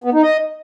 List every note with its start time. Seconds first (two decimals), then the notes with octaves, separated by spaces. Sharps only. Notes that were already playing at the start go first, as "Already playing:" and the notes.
0.04 B3
0.13 D#4
0.23 D#5